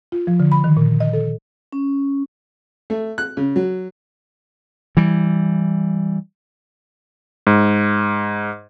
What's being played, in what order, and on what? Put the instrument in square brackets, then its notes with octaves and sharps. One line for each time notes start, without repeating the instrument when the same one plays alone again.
[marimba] F4
F3
D3
B5
D#3
A#2
D#5
A4
[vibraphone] C#4
[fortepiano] A3
F#6
C#3
F#3
[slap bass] E3 G3
[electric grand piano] G#2